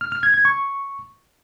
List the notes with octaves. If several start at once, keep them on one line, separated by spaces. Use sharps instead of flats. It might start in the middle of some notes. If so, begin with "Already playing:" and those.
F6
F6
G#6
G#6
C#6